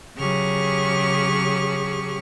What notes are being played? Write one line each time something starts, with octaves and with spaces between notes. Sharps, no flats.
C#3 F#3 G4 G#4 C#6 F6